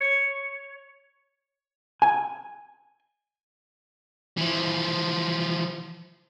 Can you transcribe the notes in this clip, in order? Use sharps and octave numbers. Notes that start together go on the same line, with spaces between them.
C#5
G#5
E3 F3